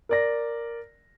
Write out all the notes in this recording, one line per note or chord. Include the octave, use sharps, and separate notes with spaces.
A#4 D5 A#6